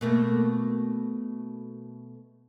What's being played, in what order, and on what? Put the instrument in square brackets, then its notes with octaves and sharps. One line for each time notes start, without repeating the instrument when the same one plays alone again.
[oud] B2 A3 A#3